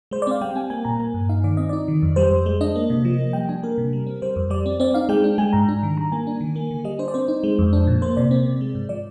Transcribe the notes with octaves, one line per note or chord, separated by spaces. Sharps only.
G#3 C5
D5
C4 F5
G3 G5
C4 G#5
A#3 G#5
A#2 A#5
A#3 G#5
G2
D#4 F5
D#3 D5
C4 D#5
D#4 D5
D#3
F2
G3 C5
F2
G#3
D4 D#5
A#3
C3
F3
A#3
G3 G5
D4 G#5
A#3 A#4
C3
G3
C4
G3 C5
F2
G3 D5
C4
C4 D5
D#4 F5
G#3 G5
D4
G#3 G#5
G#2 A#5
D4
D#3
G3 A#5
A#3 G#5
D4
D#3
A#3
D3
G3 D#5
D4 C5
D5
C4 C5
D#4
G#3
F2
D4
A#2
A#3 C5
C3 D5
C4
C3
G#3
G#2
F3 D5